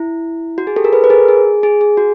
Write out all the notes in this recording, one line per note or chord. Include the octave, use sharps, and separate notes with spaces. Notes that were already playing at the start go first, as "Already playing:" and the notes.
Already playing: E4
F#4
G#4
G4 A4
G#4 A#4
A4 B4
B4
G#4 A#4
G#4
G#4
G#4
F#4